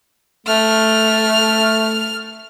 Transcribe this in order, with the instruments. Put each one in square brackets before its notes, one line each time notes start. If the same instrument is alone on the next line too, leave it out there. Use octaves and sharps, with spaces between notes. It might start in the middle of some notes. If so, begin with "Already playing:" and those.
[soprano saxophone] A3 [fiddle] F6